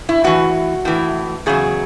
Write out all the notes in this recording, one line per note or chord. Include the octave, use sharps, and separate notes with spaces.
E4
A2 E3 F#4
A2 E3
E2 C#3 F#3 G#4